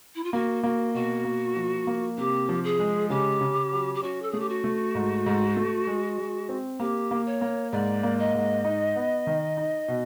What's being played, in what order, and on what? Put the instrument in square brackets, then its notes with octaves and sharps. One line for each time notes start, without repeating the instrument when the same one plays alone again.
[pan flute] E4
F4
[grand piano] A#3 [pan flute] F#4
[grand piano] A#3 [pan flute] F#4
[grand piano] B2 [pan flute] F#4
[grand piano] A#3
F3
A#3
[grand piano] C3 [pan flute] G4
[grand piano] F3
[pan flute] G#4
[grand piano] G#3
[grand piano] C#3 [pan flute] G4
[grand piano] C#3
F#3
[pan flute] G4
[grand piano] C#4 [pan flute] F#4
[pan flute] A4
[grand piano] A3 [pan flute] G#4
[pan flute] G4
F#4
[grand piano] A3
G#2
G#2
A3
G#3
G#3
C4
[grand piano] A#3 [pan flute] G4
[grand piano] A#3
[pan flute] C#5
[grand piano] A#3
[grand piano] G#2 [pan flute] D5
[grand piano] A#3
[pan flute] D#5
[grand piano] G#2
D#4
B3
D#3
D#4
B2